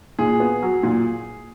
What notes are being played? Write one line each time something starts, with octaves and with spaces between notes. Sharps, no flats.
A#2 G#4
B3
F#3
A#2